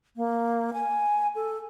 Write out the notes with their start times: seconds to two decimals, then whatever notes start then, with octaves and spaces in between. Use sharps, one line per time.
0.17 A#3
0.73 G#5
1.35 A4